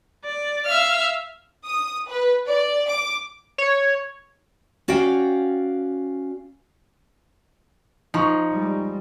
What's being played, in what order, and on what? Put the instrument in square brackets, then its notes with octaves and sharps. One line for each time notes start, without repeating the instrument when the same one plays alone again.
[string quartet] D5
E5 F5 F6
[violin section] D#6
B4
D5
D6
[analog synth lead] C#5
[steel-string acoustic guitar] C#4 F#4 D5 F5 G5
[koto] F3 [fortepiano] D#4 C#6
[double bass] G3 G#3